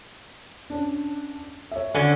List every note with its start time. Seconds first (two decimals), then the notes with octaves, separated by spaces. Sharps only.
0.70 C#4 D4
1.71 C#5 E5
1.94 D3 C#4 F#4